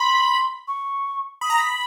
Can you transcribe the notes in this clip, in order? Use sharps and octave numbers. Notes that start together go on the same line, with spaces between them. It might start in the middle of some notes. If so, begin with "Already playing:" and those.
Already playing: B5 C6
C#6
B5 D#6
A#5
B5